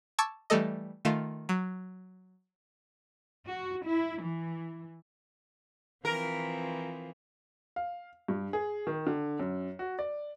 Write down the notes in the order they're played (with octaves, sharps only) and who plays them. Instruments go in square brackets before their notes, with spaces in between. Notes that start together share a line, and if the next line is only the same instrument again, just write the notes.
[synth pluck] A5 C#6 D6 E6 G#6 A6
E3 G3 A3 A4 D#5
D#3 A3 F4 E7
F#3
[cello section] F#4
E4
E3
[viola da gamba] E3 F3 C4 [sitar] A#4
[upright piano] F5
G2
G#4
D#3
D3
F#2
F#4
D5